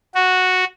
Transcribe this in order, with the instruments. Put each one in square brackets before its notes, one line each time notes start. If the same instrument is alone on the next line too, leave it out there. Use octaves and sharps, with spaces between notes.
[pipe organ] F#4